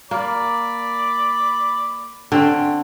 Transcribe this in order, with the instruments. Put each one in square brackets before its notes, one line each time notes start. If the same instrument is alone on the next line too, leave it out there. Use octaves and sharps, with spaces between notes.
[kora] A#3 [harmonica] D5 B5 D6
[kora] D3 C4 [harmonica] C#4